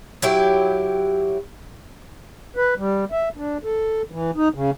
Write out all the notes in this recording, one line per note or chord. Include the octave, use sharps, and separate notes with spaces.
F#3 E4 G4
B4
G3
E5
D4
A4
E3
D#4
C#3